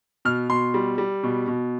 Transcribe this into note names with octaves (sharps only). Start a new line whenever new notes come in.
B2 F6
B2 C6
G3
G3
B2
B2